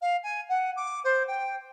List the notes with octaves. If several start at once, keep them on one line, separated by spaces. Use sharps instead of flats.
F5
G#5
F#5
D6
C5
G5